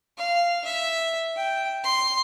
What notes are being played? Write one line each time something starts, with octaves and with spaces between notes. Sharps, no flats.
F5
E5
G5
C6